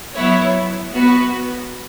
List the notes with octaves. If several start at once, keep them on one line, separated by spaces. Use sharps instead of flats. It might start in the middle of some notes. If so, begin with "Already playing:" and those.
F#3 B3 E4 C#5
B3 F#4 B4